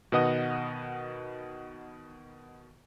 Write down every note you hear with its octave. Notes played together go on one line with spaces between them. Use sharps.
B2 D#3 B3 D#5 F#5 D#6